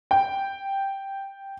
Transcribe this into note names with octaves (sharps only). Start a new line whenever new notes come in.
G5